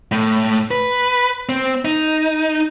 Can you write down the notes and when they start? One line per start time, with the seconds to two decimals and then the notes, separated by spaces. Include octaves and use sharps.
0.12 A2
0.71 B4
1.49 C4
1.85 D#4